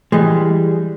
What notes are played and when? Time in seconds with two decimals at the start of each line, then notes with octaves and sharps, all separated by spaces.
0.12 E3 G3 G#3